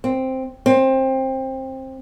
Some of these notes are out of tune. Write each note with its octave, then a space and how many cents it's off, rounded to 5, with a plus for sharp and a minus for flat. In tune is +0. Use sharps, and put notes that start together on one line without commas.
C4 +0
C4 +20